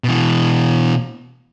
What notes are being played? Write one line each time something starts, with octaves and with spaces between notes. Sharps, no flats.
B2 E3